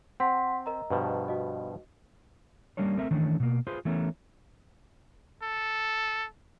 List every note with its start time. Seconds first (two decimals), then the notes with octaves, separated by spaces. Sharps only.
0.20 C4 F#5 C6 B6
0.66 A#4 D#5 A#5
0.90 G2 B2 F3
1.28 F#4 D#5
2.77 G3 A#3 C#4 D4 C#5
2.98 A3 C4 A#4 E5
3.11 D#3 E3 A3 C#4 D4
3.40 B2 A#3
3.67 F4 G#4 B4 C5
3.85 E3 A3 B3 C#4 A#4
5.43 A4